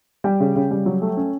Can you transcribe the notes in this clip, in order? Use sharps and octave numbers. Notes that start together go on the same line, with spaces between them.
G3 G5
C#3
C#3
G3
F#3
A3
C#4